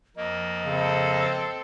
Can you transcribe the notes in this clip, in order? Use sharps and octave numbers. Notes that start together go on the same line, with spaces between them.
F2 A#3 D#5
C#3 C4 A4